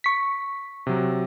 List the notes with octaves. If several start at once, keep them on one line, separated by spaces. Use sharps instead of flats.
C#6 B6
C3 F#3